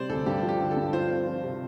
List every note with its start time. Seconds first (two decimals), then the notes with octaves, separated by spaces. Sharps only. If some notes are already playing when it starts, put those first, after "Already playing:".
Already playing: C3 G3 C4 C5 D5
0.09 D2 A4
0.26 G2 G4
0.43 F3
0.48 G4
0.60 D3
0.71 A4
0.77 G2
0.93 F4 C5
1.10 C4
1.27 F3
1.43 C3